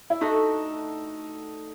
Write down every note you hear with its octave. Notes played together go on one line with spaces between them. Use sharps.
E4
A3 D4 D#4 F#4 A4